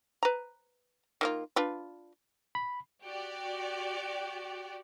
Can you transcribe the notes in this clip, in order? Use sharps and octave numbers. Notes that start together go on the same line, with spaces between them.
B4 A#5
D#3 A#3 F4
D4 F4 B4
B5
F#4 G4 D5